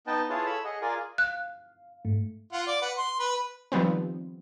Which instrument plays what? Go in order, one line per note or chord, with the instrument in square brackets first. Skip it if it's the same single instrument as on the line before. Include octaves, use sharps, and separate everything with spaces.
[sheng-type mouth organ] B3 D#4 B4 D#5 G5 A5
E4 F4 G#4 B4 C#5 A5
A4 C#5 B5 E6
G#4 D#5 F#5
F4 G#4 A#4 D5 G#5
[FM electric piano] F5 [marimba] F#6
[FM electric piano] G#2 A3
[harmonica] F4 F#5
D5
B4 F#5
C6
B4 B5
[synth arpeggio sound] D#3 F3 G3 B3 C4